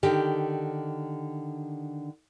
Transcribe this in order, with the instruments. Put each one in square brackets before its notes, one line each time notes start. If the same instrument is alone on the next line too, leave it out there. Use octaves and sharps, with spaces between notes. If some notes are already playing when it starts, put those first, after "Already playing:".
[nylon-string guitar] D3 D#3 G4